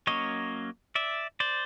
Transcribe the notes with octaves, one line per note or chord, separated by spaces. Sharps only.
F#3 A#3 C#4 C#5 D#5
D5 E5
C5 D5